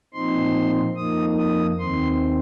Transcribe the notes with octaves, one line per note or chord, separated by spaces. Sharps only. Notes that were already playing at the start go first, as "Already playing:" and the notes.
A#2 F3 C4 D#4 C6
F2 F3 A#3 D#4 D#6
D#6
D#2 D#3 C4 C6